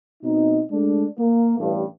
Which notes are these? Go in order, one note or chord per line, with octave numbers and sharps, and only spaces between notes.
B2 C4 D#4
G#3 A3 D4
A#3
A1 G2